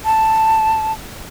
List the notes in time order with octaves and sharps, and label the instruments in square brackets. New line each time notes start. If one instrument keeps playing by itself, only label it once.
[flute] A5